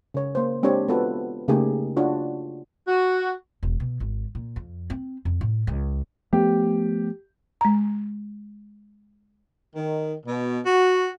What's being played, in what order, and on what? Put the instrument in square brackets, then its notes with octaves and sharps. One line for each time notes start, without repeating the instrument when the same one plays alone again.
[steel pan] C#3 C#5
A#3 C5
G#3 C4 D4 G4 C#5
B3 F4 F#4 A4 B4
C#3 A3 A#3 D#4 G4 G#4
D4 F4 F#4 C#5
[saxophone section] F#4
[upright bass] E1
B2
G#1
A#2
F2
C4
F2
A2
C#2
[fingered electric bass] F3 A3 B3 [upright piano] G4
[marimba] G#3 A#5
[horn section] D#3
B2
F#4